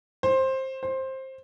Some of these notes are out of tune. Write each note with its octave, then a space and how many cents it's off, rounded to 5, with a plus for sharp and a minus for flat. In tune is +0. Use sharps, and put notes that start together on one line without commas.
C5 +15
C5 +15